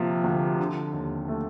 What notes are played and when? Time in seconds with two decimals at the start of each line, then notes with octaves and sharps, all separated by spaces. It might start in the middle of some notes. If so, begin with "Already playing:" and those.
Already playing: C3 F3 A#3
0.24 D2
0.59 D3
0.93 D#2
1.28 A3